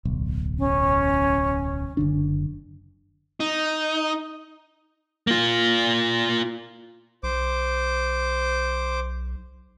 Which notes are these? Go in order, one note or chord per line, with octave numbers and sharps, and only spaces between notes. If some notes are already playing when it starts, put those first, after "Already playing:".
D1 B1
C#4
F#1 D3 D4
D#4
A#3 F4
B1 C5 D6